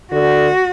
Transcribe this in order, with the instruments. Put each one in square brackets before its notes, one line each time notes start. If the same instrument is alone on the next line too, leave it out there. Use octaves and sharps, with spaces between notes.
[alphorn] D3 [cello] F#4